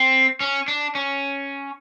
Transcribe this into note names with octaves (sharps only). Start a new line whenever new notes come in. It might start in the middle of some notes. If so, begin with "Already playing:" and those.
Already playing: C4
C#4
D4
C#4